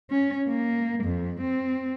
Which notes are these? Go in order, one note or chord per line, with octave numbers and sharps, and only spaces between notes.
C#4
A#3
F2
C4